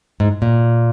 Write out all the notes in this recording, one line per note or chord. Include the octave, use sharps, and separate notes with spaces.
G#2
A#2